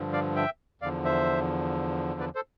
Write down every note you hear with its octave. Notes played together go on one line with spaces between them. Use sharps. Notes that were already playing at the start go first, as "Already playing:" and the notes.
Already playing: G2 D3 F3
D5 F5
E5 G5
E2 D3 F3 D5 F5
C5 E5
B4 D5
A4 C5